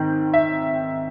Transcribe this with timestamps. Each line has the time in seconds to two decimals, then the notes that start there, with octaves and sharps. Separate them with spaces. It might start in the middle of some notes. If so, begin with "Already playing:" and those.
Already playing: G#2 D#3 C4
0.33 E5